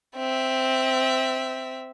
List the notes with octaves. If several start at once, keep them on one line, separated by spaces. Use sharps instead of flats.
C4 E5